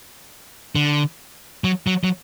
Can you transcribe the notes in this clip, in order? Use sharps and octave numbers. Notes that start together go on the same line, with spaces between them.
D3
F#3
F#3
F#3